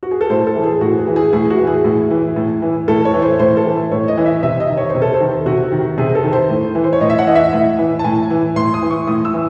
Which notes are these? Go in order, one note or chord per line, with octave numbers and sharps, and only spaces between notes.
F#4
G#4
A4
A2 C5
A4
E3
G#4
A2 F#4
G#4
E3
G#4
A2 G#4
F#4
E3
G#4
A2
E3
A2
E3
A2 A4
C#5
E3
C5
A2 C5
A4
E3
A2 C#5
D#5
E3
E5
C3 E5
D#5
D#3
C#5
C5
C3
A4
C5
D#3
C3 F#4
D#3
C3 G#4
A4
D#3
C5
A2
E3
C5
C#5
A2 D#5
E5
F#5
E3 D#5
E5
A2
E3
A5
A2 G#5
E3
A2 C6
D#6
E3
C#6
A2 D#6
E6
E3